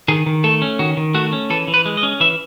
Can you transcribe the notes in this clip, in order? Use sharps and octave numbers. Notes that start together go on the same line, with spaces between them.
D#3 G#4
D#3
A3 A4
C#4
D#3 F#4
D#3
A3 F#4
C#4
E3 A4
E3
B4
G#3
D#5
C#4
E3 E5